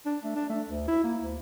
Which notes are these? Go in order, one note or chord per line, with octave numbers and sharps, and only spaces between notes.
D4
A3
D4
A3
D2
E4
A#3
D2